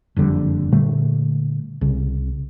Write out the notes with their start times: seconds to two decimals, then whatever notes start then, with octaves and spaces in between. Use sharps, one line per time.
0.16 F#1 F2 D3 G3
0.72 A#2 D3 G3 A3
1.81 C2 C#3